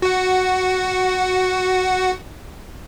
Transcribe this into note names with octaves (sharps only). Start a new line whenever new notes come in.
F#4 F#5